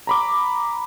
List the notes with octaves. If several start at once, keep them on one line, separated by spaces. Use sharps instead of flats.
A#5 B5 D6